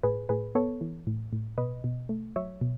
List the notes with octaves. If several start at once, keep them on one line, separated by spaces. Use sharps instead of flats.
A2 G#4 B4
A2 G#4 B4
B3 A4 C#5
E3
A2
A2
B2 B4 D#5
B2
A3
F#3 C#5 E5
B2